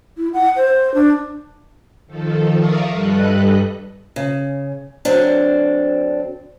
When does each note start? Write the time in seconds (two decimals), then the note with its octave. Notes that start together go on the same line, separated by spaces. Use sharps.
0.18 E4
0.34 F#5
0.56 C5
0.94 D4
2.07 D#3 F3 A4
2.54 A#4 D5 E5 F5 C#6 D#6
2.92 G2 G3 A4 B4 D#5 F#6
4.16 C#3
5.05 D3 F#3 C4 D4